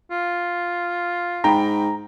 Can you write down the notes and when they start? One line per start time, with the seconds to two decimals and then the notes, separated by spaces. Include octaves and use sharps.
0.11 F4
1.44 G#2 G5 A#5 B5